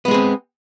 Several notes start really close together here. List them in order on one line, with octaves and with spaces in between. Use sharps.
B3 G#3 G#4 C4